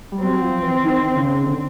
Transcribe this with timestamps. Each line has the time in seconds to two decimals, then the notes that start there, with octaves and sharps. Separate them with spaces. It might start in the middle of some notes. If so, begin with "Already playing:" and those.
0.12 G3
0.20 F#3 C4
0.41 F3
0.62 E3
0.84 D#3
1.14 C#3
1.46 D3